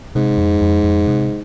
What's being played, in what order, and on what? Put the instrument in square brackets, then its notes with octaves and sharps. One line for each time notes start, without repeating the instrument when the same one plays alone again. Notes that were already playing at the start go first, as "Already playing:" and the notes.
[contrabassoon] G#2 [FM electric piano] C3
[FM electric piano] F2
F2
F2
C3